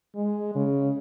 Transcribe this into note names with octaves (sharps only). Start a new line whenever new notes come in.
G#3
C#3